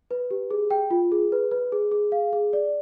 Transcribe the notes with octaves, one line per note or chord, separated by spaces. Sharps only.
B4
G4
G#4
G5
F4
G#4
B4
B4
G#4
G#4
F5
G#4
D5